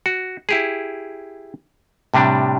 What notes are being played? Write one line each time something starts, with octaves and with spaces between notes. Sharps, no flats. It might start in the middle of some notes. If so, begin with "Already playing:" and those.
F#4
E4 G4 G#4
A2 C3 G3 D4